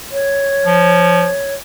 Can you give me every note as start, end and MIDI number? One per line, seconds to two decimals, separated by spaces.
0.11 1.54 73
0.65 1.27 53